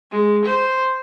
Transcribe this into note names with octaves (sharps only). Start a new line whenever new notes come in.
G#3
C5